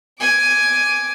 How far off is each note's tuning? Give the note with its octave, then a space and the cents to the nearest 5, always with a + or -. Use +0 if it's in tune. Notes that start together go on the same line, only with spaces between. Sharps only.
G#5 +10 D6 +0